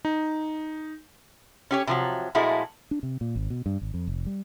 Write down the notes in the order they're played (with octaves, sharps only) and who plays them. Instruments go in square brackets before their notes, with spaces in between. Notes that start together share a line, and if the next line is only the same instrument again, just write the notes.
[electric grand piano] D#4
[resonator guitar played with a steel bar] C#4 G4 C#5
C3 F3 F#3
A#2 F3 G#3 A3 E4 F#4
[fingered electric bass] D4
C3
A#2
G#1
B2
G2
G#1
F2
F1
G3